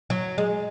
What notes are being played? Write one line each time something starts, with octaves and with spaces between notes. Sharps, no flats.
F#3
G#3